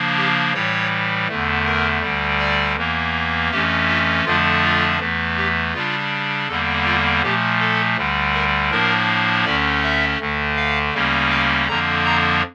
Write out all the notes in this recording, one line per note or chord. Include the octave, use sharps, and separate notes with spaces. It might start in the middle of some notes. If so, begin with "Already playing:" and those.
Already playing: C#3 F3 A#3 D4
G4
A2 E3 G3 C#5
E2 D3 A3
A#4
D2 D3 G3
D5
E2 E3 A#3
F2 E3 A3 C#4 G4
F4
F2 D3 F3 A3 D4 F4
F4
E2 E3 A3
G4
C#3 G3 D4 F4
E2 D3 G3 A#3 A4
F4
A#2 F3 A3 G4
A4
D2 D3 G3
A#4
A2 F3 A#3 D4 A#4
D2 D3 A3 C#4 D5
E5
D2 D3 A3
F5
D2 C#3 G3 A#3 C#4
F5
F2 D3 F3 A#3 D4 A#5
A#5